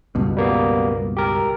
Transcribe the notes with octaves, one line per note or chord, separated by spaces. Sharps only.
C#2 G2 B2
G3 A#3 B3
G4 A#4